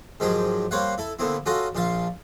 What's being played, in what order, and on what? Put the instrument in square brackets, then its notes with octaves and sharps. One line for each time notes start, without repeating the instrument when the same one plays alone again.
[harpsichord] G#2 D#3 F3 F#3 G4 G#4
G3 A#3 C5 C#5 F5 F#5
E4 A4
A#2 D3 B3 C4 E4
C#4 F4 F#4 A4 D#5 F5
A#1 A#2 F4 F5 A5